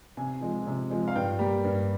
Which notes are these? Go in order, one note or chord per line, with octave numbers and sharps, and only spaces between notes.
C3 G#5
F3 G#3
C3
F3 G#3
F5
G2 G5
G3 A#3
G2